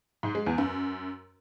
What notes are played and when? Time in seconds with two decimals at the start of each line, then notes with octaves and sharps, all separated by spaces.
0.23 G#2
0.35 G#3
0.46 E2
0.58 F#2